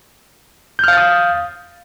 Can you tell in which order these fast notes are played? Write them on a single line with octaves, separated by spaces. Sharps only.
G6 F6 F5 A6 D#6